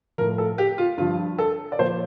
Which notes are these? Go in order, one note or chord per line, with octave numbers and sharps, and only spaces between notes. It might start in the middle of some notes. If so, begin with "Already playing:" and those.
A2 F3 A#4
A4
G4
F4
G2 F3 F4
A4
D5
A#2 F3 C5